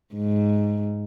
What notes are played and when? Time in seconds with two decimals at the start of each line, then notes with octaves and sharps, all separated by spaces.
0.15 G#2